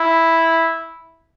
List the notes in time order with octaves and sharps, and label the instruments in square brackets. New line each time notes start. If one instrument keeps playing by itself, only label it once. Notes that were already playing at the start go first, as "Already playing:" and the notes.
Already playing: [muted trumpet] E4